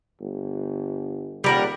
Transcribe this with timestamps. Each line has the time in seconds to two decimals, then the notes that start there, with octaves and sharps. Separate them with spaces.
0.21 G1
1.44 D#1 G3 A#4 F#5